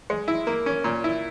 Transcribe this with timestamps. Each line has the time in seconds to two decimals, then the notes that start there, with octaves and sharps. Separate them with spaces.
0.10 G#3
0.28 E4
0.47 A#3
0.66 C#4
0.84 A#2
1.04 E4